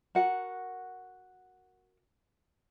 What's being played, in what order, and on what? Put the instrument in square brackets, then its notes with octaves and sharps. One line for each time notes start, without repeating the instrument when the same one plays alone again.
[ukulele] F#4 A#4 F#5